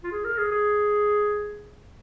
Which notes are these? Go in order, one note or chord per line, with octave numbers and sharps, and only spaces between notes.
F4
G#4
A#4
G#4
G#4